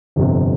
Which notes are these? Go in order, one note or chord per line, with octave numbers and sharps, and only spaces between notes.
G1 F2 C3